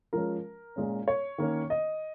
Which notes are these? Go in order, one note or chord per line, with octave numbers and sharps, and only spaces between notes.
F3 G#3 C#4 A#4
A#2 G#3 C#4
C#5
D#3 A#3 C#4
D#5